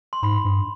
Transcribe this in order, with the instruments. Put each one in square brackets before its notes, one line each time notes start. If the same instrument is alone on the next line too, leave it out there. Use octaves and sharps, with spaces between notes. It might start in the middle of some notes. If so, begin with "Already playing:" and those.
[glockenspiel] C6
[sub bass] G#2 [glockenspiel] B5
[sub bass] G2